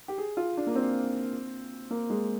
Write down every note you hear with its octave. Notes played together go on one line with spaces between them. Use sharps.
G4
G#4
F4
D4
A#3
C4
A#3
G#3